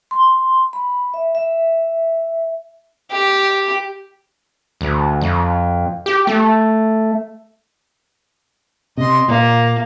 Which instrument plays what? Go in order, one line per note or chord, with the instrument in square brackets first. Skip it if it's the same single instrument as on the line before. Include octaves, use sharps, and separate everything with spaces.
[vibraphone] C6
B5
E5
E5
[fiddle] G4
[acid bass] D2
F2
G4
A3
[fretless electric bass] C3 [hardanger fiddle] D#5 C6
[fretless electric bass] A#2 [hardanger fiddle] A#3